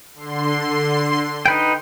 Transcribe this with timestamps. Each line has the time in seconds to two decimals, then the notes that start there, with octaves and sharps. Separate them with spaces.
0.15 D3 C6
1.46 D#4 B4 G5